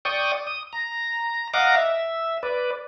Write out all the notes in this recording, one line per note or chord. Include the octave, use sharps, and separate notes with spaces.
D5 G5 C#6 D#6
D#6
A#5
D#5 F5 F#5 A#5 D6
E5
B4 D5